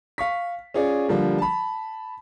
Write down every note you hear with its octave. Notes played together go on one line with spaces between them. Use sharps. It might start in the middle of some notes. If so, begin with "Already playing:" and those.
F5 C#6 B6
C#4 F4 G#4 C#5 D5
D3 F3 G3 A#3
A5 B5